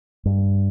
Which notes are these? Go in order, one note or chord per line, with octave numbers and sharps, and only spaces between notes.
G2